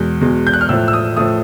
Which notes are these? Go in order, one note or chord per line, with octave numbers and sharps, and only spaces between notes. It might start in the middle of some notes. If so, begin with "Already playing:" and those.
Already playing: E2 B2 G#3
E2 B2 G#3
G6
F#6
F6
A2 F3 A3 E6
E6
D#6
A2 F3 A3 D#6